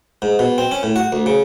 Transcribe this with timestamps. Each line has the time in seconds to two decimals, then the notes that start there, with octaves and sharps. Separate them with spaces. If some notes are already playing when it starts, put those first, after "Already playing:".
0.22 G#2
0.39 B2
0.58 C4
0.72 C#4
0.83 A2
0.96 F#4
1.13 D2
1.26 C#3